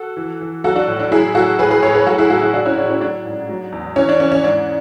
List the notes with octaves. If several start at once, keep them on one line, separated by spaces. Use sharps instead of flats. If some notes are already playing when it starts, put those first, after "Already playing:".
Already playing: F#4 A4
E3
E3
F#3 F#4 A4
D4 F#4
A2
D4
F#3 E4 G#4
F#3 F#4 A4
A2 G#4 B4
G#4 B4
A2 A4 C#5
G#4 B4
F#3 F#4 A4
E4 G#4
F#3 F#4 A4
E4 G#4
A2 D4 F#4
C#4 E4
A2 D4
C#4
F#3 D4
G#2
F#3
E2
E3 C#4
D4
E3 C#4
C#4
G#2 D4